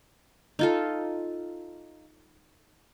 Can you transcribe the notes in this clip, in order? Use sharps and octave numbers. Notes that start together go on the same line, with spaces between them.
D#4 F4 A4